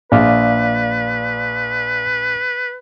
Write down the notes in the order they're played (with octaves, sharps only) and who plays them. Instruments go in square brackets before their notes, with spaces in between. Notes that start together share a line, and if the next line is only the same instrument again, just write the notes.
[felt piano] A#1 [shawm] B4 [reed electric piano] D5 F5 D6